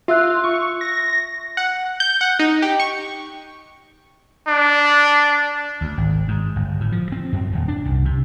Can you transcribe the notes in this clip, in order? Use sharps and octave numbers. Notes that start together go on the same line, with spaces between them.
F4 E5 E6 F#6
C#6
A#6
F#5
G6
F#5
D#4
G4
C#6
D4
D2
G#1
G#2
G1
A2
F3
C4
F#2
D#1
D4
C2
C3